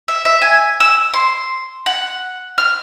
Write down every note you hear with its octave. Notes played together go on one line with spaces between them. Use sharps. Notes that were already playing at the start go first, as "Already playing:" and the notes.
E5
E5
G#5
E6
C6
F#5
F6